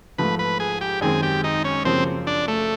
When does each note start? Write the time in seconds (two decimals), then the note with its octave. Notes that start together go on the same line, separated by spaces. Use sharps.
0.18 G#2 F3 A3 B4
0.39 B4
0.60 G#4
0.81 G4
1.01 F#2 D#3 G#3 C4 G#4
1.23 G4
1.44 D#4
1.64 C#4
1.85 F#2 C#3 F3 A#3 C4 C#4
2.27 D4
2.48 A3